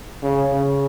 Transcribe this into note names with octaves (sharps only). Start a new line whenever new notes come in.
C#3
C#3